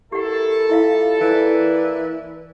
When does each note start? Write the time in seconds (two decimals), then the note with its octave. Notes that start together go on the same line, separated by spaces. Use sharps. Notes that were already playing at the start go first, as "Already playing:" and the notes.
0.12 E3 E4 G4 A4 A#4 F#5
0.69 G3 E4 F4 E5 F5
1.21 E3 A#3 B4 D5